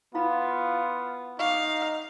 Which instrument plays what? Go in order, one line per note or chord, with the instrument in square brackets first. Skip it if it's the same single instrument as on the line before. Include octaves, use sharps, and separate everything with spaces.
[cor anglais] B3 [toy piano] E4 F5 B5 [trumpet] F4
[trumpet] D#4 [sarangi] F5 [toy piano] C#6 D6